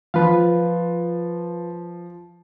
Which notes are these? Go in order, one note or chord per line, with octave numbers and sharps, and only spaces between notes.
F3 F4 B4 F5